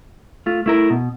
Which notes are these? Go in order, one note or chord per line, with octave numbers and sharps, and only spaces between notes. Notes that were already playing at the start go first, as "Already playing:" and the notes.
A3 F4
A3 E4 A#4
B2